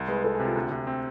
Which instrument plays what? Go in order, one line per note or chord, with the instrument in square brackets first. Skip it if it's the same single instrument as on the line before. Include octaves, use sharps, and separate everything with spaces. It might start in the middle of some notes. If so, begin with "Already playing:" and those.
Already playing: [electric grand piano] C2
[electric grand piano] G#3 [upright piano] B4
[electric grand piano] C2 [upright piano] A4
[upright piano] G#4
[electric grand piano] C3
[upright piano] F4
[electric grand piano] D2
C3
C4